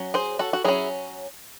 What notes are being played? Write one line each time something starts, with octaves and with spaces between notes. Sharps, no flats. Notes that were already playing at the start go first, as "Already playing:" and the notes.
Already playing: F#3 C#4
G#4 C5
F#4 A4
F#4
F#3 C#4 E4 G#4